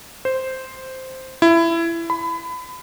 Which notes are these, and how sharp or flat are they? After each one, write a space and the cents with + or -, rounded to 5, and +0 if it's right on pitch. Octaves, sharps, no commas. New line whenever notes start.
C5 +0
E4 +20
B5 +25